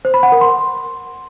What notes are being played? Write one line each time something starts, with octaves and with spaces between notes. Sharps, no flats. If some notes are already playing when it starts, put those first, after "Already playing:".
C5
B5
F#5
A#4
C6